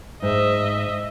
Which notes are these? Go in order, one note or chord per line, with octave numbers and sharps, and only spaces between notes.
G#2 D#5 E5